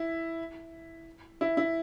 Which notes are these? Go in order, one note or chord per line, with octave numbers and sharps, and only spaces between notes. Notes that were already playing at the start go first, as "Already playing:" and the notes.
Already playing: E4
E4
E4